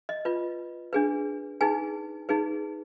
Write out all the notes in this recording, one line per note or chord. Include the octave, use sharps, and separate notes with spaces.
D#5
F4 B4
D4 G#4 B4
D#4 G#4 B4 G#5
D#4 G#4 B4